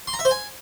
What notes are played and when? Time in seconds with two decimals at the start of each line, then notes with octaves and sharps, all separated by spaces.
0.07 C6
0.13 A#5
0.19 E5
0.25 C5
0.31 G#5